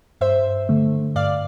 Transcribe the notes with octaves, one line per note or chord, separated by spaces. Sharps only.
G2 C5 E5
D3 A3
G2 D5 F5